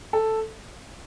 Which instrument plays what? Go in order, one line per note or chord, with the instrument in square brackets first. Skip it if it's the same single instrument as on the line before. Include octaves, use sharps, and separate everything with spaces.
[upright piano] A4